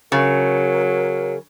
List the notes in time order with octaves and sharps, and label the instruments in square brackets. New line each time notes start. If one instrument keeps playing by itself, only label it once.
[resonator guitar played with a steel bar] C#3 [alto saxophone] F#3 [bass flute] A#4